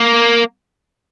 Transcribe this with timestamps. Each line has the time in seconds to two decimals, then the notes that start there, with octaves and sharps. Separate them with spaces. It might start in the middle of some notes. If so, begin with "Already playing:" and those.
Already playing: A#3